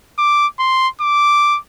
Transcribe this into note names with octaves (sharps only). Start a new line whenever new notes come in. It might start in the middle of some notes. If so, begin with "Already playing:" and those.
D6
C6
D6